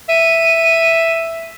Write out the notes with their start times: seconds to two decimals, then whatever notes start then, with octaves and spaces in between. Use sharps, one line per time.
0.09 E5 D#7